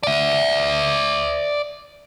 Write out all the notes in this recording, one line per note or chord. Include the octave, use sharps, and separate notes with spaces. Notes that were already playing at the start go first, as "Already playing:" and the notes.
D5 E5